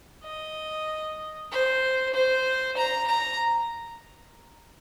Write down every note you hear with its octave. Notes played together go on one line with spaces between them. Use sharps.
D#5
C5
C5
A#5
A#5